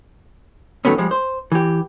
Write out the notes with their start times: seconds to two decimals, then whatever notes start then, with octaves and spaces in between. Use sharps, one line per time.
0.85 A2 D#3 F#3 A3 B3 C#4
0.98 F3 G3 G#3
1.11 C5
1.52 E3 G4